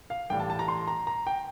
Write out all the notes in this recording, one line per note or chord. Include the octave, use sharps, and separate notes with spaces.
F5
A1 A2 G3 G5
A5
A5
A#5
C6
A#5
A#5
G5